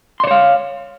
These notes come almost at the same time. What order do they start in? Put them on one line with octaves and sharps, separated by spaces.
C6 D5 C#5 F5